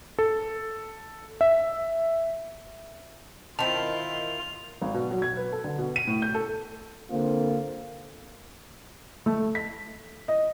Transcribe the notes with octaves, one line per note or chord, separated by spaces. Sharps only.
A4
E5
D#3 C4 E4 F4 A5 F7
G#1
B2
F#3
G#6
B4
A4
D3
B2
D#7
A2
G6
A4
D3 A#3 C4 F4
A3
B6
D#5